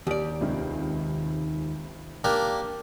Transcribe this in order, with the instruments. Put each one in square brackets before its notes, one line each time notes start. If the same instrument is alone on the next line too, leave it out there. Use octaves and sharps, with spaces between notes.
[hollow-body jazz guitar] D#2 D5 [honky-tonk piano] G4
[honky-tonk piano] C#2 C3 D#3
[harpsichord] A#3 D4 G4